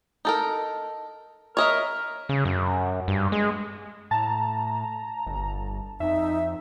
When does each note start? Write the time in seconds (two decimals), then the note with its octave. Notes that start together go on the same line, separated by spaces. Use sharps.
0.25 D#4 A4 A#4
1.57 A#4 C#5 D#5 E5
2.29 C#3
2.45 F#2
3.08 G2
3.32 G#3
4.11 A2 A5 A#5
5.26 G1
6.00 F2 D#4 E5